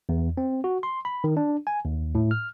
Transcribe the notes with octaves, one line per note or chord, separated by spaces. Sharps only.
E2
C4
F#4
C6
B5
D#3
D4
G#5
D#2
A2
F6